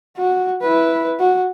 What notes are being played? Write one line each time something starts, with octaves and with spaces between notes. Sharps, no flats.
F#4
E4 B4
F#4